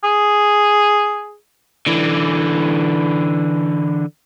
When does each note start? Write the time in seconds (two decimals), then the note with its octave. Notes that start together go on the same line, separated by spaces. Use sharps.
0.04 G#4
1.87 D3 E3